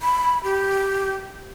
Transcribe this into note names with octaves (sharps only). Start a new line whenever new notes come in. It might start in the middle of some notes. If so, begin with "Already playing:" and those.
B5
G4